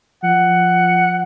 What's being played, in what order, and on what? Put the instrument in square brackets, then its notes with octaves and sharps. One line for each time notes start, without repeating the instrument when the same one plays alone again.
[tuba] F3 [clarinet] F#5